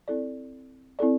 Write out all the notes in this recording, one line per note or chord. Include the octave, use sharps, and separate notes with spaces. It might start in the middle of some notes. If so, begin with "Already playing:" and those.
C4 E4 A4 D5
C4 E4 A4 D5